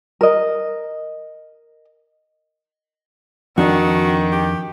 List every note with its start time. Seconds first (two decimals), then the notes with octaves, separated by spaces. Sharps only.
0.21 A#4 D#5
3.58 F2 D#3 D4 F#4
4.32 G4